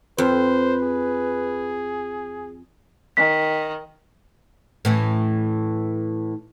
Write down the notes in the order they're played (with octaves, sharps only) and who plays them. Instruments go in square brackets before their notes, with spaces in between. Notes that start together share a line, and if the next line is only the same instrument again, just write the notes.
[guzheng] F2 [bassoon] B4 [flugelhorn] C5
[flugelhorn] G#4
[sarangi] D#3 [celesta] B6
[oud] A2 E3 C#4